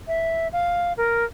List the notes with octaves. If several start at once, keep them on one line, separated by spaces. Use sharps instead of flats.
E5
F5
A#4